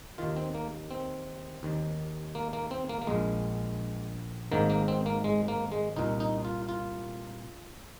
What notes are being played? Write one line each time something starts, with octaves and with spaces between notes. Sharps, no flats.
D#2 D#3 F4
C4
A#3
C4
D#2 D#3
A#3
A#3
C4
A#3
A#3
A#1 A#2 G#3
G#1 G#2 D#3 A#3
A#3
C4
A#3
G#3
A#3
G#3
C2 A#2 D#4
D#4
F4
F4